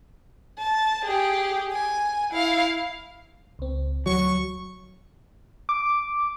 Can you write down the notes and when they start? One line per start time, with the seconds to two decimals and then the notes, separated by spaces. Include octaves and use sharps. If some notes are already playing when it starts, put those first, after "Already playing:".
0.59 A5
1.05 G4 G#4
1.72 G#5
2.32 E4 F5
3.59 C#2 C4
4.06 D2 F#3 C#6
5.69 D6